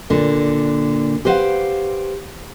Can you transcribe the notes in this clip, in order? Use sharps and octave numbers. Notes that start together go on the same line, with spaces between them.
A#2 D3
G4 B4 C5 D#5 F5 F#5